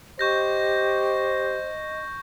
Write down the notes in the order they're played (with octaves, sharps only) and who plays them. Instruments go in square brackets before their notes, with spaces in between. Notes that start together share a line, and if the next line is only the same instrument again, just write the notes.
[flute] G4 [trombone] C5 [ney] D#5 [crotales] C#6 G6 A#6